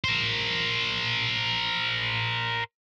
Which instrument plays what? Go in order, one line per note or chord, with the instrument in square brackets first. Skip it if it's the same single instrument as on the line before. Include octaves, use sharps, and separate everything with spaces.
[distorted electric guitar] A#4 C5